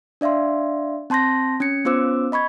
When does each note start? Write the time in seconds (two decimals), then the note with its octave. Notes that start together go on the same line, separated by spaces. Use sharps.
0.21 D4 D5 E5 F5 C6
1.10 C4 A5 C6 G6 A#6
1.60 C#4 G#6 C#7
1.85 B3 C#4 F4 C5 D6 E6
2.32 D#5 B5 C#6 G#6